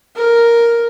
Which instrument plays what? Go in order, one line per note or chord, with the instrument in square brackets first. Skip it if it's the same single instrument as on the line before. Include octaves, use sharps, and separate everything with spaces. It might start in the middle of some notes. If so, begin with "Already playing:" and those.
[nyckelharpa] A#4